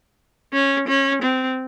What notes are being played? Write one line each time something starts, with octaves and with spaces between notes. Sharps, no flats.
C#4
C#4
C4